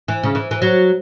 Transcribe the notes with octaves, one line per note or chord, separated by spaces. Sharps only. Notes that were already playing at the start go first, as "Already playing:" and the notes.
E3
C#3
E3
E3
F#3